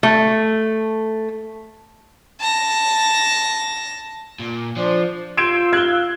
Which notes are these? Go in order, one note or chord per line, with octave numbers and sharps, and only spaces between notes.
A3
A5 A#6
A#2
F3 D4 C5
F4 C6 E6 G6 G#6 D7 E7
F5 F#6 G#6 G7